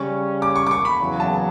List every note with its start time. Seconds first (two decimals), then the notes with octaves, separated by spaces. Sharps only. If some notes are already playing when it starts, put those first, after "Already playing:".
Already playing: C#3 G3 C#4 C#6
0.42 D6
0.56 C#6
0.67 D6
0.71 C#6
0.85 B5
0.99 E2 C#3 F#3
1.20 A5